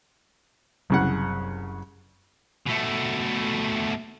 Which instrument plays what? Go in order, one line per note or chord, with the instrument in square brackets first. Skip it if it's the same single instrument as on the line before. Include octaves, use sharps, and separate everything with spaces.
[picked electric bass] F#1 F#3 C4 [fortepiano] C2 C#3 F#5
[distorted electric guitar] B2 A3